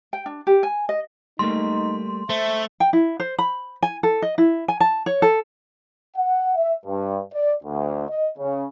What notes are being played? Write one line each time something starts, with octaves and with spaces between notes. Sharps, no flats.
G5
D4
G4
G#5
D#5
G3 A3 A#3 D#4 C6
A3 C5 E5
G5
E4
C5
B5
G#5
A4
D#5
E4
G#5
A5
C#5
A4
F#5
E5
G2
D5
D2
D#5
C#3